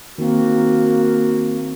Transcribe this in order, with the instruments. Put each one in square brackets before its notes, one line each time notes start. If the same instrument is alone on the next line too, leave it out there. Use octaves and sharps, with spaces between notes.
[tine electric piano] D#3 C4 [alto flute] A#3 [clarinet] F#4